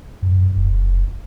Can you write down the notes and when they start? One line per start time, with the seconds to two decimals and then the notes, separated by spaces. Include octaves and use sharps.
0.22 F#2
0.56 F1